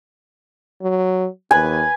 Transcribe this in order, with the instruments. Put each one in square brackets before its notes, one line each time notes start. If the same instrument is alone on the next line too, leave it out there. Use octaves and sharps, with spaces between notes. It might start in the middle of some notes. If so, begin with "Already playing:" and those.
[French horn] F#3
[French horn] D#2 [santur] B4 G#5